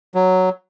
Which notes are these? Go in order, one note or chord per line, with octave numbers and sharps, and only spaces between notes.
F#3